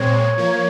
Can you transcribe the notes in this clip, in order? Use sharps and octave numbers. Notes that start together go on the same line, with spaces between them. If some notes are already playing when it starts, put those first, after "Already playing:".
Already playing: A#2 G#3 C4 C#5
F3 A#3